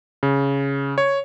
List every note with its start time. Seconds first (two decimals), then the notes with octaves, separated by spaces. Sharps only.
0.23 C#3
0.98 C#5